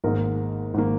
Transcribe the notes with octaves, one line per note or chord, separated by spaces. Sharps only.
G#1 G#2 D#3 A#3 A#4
G#1 D#3 A#3